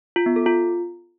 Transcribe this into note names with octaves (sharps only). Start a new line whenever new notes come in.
F4
B3
A4
F4